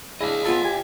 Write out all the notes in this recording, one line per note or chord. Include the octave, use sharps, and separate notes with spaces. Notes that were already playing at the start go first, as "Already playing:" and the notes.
D4 E4 G#4 D#5 F5
B3 F4 A4
G4 G#5